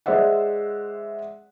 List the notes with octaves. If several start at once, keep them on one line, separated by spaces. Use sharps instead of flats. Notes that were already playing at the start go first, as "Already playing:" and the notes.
G#3 C5 D5 E5 F#5